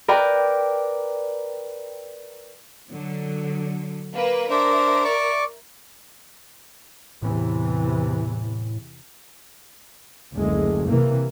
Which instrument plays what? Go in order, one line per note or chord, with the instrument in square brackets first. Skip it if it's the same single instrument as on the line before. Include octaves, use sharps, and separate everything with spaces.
[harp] A#4 B4 D5 G5
[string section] D3 F#3
A#3 B4
[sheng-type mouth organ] D4 C5 [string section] A#4 E5
[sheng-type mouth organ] D5 C#6 D6
[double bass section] E2 C3 E3 [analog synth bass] A2
[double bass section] F#1 D2 G#3
C3 E3 A#3